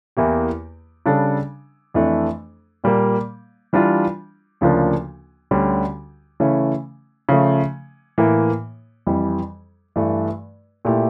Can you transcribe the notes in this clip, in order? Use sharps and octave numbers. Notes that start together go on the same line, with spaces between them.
E2 E3 A#3 E4 G4
C#3 G3 D4 A4
F2 E3 A3 D4
A#2 G3 A#3
E3 G3 D4 F4
D2 C#3 F3 A#3 D4
D2 D3 G3 C#4 G4
C#3 E3 A3 C#4
C#3 F3 A3
A2 E3 A#3
F2 E3 G3
G2 E3 A3
A#2 A3 E4 G4